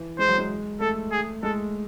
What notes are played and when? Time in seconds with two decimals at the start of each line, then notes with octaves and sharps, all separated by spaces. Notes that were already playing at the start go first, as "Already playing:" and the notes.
Already playing: E3
0.19 G#3 C5
0.28 F#3
0.38 G#3
0.81 A3 A4
1.12 G#4
1.43 G#3 A4